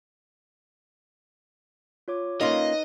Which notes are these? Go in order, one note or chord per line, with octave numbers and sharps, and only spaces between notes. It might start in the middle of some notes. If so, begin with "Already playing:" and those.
F4 C#5 D6
A#3 C#4 D#4 F4 B4 D#5